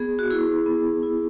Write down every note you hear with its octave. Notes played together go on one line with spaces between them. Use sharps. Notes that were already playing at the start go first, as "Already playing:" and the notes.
Already playing: B3 G#4
F#4
E4 G#4
B3
E4